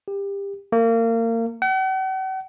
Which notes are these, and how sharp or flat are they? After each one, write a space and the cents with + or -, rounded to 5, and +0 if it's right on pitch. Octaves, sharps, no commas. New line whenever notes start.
G4 +25
A#3 -30
F#5 +45